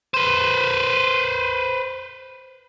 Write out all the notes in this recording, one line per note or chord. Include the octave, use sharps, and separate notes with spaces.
B4 C5